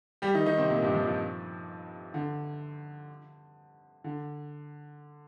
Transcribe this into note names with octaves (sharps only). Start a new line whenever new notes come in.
G3 G4
D#3 D#4
D#3 D#4
C3 C4
A#2 A#3
G2 G3
F2 F3
F2 F3
D3
D3